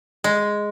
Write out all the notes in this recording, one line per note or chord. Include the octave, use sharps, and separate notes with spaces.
G#3